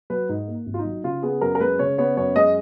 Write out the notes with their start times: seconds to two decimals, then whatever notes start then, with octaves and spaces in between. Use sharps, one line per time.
0.10 F#3 B4
0.29 G#2 D#4
0.48 A#3
0.66 G#1
0.74 F4
0.79 D#4
0.85 F#3
1.04 C#3 F4
1.22 B3 G#4
1.41 F#2 A#4
1.55 A#4
1.60 G#3 B4
1.79 C#3 C#5
1.98 B3 C#5
2.17 F#2 C#5
2.36 G#3 D#5